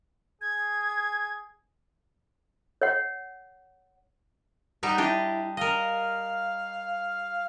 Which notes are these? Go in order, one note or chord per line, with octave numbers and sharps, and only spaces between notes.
G#4 G#6
C#5 F#5
G3 D#4 G4 F#5
D4 E4 G4 D#5
A#4 D#5 F5